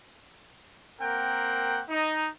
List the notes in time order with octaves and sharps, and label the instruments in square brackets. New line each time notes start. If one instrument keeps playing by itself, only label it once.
[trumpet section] A#3 C4 A#4 F#5 G5
D#4